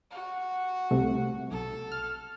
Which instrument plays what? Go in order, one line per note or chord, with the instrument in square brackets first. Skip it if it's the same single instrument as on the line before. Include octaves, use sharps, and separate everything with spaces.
[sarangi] F#4
[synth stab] C2 C3 A3
[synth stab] B1 [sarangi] A4
[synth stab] F6